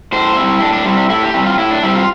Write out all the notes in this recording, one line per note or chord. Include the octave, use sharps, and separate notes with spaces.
A2 C5
G3 C4 E4
A2 D4
D4
G3 C4 E4
E4
A2 E4
G4
G3 C4 E4
F4
A2 E4
D4
G3 C4 E4
F4